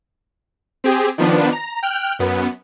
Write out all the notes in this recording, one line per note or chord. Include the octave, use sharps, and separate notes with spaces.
C4 G4 G#4
D#3 F3 B3 D4
A#5
G5 F6 F#6
F#2 B3